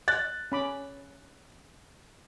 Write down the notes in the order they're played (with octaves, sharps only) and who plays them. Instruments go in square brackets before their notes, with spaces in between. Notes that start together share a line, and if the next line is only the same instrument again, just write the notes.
[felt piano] F#6 A6
[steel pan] C#4 B5 D6